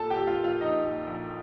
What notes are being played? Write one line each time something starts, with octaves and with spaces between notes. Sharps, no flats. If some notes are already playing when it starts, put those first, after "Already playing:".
Already playing: A#2 A4 A5
G4 G5
A#2
F4 F5
A#2 F4 F5
A#1 D#4 D#5
A#2
A#1